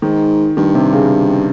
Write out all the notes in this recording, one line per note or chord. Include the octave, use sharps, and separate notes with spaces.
G#2 D#3
G2 D#3
C3
C#3